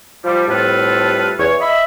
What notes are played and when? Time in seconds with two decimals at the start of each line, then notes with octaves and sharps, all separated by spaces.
0.24 F3 G3
0.47 A2 G3 C4 F4 A4 B4
1.38 E2 C#5
1.60 D#5 E5 B5